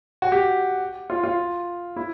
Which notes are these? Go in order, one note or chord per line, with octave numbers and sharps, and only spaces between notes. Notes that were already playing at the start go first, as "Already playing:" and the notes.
F#4
G4
F4
F4
E4